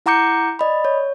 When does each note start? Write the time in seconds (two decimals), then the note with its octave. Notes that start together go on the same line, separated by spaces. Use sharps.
0.06 E4 F#5 A#5 D6 G6 C#7
0.59 D5 D#5 B5
0.85 C#5